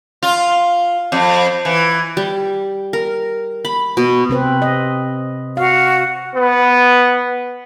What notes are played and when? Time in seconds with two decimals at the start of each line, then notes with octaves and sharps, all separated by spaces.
0.23 F4
1.12 F2
1.65 E3
2.17 G3
2.93 A#4
3.65 B5
3.97 B2
4.29 C3 C4 B4
4.62 D#5
5.57 F#4 F5
6.35 B3